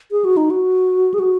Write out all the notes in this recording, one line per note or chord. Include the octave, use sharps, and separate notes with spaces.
G#4
F#4
D#4
F#4
G#4
F#4